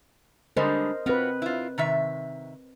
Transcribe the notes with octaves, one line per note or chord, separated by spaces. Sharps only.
D3 G3 G#3 A#4 C5 D#5
C4 F4 F#4 B4
E4 F4
C3 D#3 E5